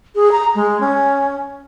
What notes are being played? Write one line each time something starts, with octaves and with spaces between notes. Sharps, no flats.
G#4
A#5
G#3
C#4